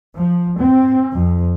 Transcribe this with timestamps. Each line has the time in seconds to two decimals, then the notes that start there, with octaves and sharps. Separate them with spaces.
0.16 F3
0.59 C4
1.12 F2 F3